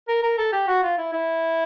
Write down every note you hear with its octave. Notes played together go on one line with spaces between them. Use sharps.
A#4
A#4
A4
G4
F#4
F4
E4
E4